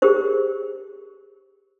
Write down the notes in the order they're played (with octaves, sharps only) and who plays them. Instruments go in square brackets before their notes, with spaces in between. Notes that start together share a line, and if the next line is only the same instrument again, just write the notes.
[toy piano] G4 G#4 A#4 C5